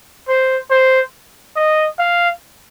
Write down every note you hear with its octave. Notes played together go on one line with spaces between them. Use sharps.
C5
C5
D#5
F5